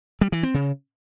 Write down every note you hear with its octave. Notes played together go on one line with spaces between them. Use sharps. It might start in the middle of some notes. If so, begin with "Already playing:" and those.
G3
E3
C4
C#3